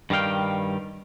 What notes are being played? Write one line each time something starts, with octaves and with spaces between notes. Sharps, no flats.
G2 D#3 G3 F5 G5